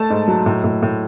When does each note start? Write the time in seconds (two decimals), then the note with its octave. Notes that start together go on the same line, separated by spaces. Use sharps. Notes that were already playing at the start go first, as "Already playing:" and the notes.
Already playing: A3 A5
0.10 G#2
0.28 F#3
0.46 A2
0.64 A2
0.82 A2